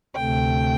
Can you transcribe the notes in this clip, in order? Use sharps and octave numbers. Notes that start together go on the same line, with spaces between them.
D2 C3 A3 G5